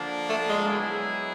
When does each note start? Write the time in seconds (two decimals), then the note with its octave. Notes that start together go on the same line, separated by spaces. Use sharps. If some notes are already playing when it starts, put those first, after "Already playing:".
Already playing: D3 F3 A#3 D4
0.29 A3
0.49 G#3
0.68 F#3 B3 E4 G#4